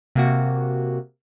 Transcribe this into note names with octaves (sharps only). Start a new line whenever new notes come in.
C3 A#3 F#4